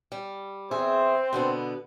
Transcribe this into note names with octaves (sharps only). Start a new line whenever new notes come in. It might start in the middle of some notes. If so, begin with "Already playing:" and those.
G3
E2 C4 G#4 C5 E5
B2 D3 B3